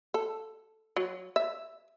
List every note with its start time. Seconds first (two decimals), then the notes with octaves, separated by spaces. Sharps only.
0.14 A4
0.97 F#3
1.36 E5